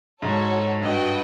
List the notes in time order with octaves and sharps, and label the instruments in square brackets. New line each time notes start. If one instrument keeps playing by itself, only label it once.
[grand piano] G#2 [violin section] F#4 A4 C#5
[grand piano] G2 [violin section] F#4 B4 D#5 G5